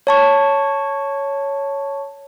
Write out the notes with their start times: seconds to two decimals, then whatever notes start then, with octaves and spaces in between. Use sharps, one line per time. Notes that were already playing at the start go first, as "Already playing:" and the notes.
0.07 C#5 A5 C#6